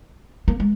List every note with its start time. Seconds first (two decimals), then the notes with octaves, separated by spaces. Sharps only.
0.48 A#3
0.60 G#3